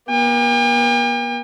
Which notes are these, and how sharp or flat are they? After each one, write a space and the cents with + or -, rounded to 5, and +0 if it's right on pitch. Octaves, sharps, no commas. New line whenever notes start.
A#3 +40 G5 +45